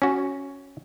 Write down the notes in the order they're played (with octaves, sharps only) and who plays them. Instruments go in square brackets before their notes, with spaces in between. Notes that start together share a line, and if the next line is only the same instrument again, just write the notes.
[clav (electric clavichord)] C#4 F#4